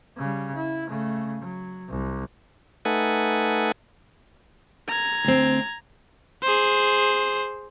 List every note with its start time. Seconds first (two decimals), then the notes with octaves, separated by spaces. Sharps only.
0.18 C#3 G3
0.55 E4
0.87 C#3 A3
1.41 F#3
1.89 C2
2.85 A3 D#4 A4 B4 F#5 G#5
4.88 A#5 G#6
5.24 D2 C4
6.43 G#4 C5